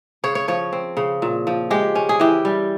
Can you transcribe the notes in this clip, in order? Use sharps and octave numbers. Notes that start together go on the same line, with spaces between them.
C#3 C#5
C#5
F3 C#5
C4
C#3
A#2
F3
G#3 G4
C#4
G#4
E3 G4
G3